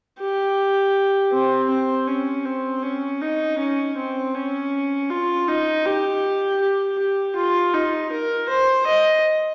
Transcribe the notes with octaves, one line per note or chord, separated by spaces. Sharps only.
G4
C4
C4
C#4
C4
C#4
D#4
C#4
C4
C#4
F4
D#4
G4
G4
G4
F4
D#4
A#4
C5
D#5